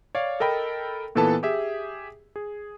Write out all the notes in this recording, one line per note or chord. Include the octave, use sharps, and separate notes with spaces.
C#5 D5 F5
A4 A#4 D#5 G5 B5
A#2 E3 B3 A4 B4 A5
G4 G#4 E5
G#4